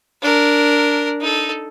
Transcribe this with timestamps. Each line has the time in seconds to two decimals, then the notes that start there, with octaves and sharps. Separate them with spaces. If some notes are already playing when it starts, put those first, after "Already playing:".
0.22 D4 A#4
1.20 D#4 A4